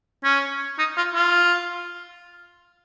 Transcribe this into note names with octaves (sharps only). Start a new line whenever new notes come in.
C#4
D#4
F4
F4